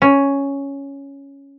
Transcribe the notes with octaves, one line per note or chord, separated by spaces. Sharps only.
C#4